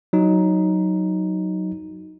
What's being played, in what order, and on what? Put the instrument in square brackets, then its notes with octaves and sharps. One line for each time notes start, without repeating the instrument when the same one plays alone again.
[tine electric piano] F#3 D#4